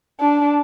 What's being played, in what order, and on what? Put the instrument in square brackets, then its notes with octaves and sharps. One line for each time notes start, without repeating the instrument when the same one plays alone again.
[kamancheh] D4